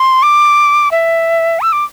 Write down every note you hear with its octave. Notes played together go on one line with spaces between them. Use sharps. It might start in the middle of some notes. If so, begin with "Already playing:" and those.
Already playing: C6
D6
E5
E6
D6